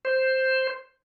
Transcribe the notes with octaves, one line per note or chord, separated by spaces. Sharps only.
C5